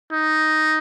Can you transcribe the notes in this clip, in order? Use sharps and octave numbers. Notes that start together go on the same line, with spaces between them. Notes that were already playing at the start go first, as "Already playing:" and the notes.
D#4